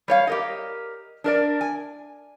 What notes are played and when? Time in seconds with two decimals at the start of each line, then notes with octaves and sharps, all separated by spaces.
0.08 G3 C#5 F5
0.27 G4 A#4 D#5
1.24 D4 A#4 D5
1.61 G#5